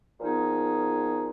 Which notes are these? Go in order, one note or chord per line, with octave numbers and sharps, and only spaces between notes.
A#2 F3 B3 D#4 G#4